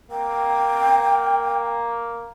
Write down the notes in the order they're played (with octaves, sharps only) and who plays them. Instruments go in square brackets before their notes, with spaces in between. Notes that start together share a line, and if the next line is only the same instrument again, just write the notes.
[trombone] A#3 [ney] G5